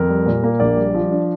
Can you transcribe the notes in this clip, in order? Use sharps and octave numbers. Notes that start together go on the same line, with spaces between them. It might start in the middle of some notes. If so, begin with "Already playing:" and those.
Already playing: F2 A#4
G3
A#2
A#3
A#1 D5
G3
F3
D4